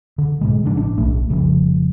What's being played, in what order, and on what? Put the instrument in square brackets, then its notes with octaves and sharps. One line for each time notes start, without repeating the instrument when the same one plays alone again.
[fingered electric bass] D3
G#2 B2 G#3
C#3 F3 A#3 D4
A1 D4
D1 B1 A#2 A3
F1 C#3 F3 G3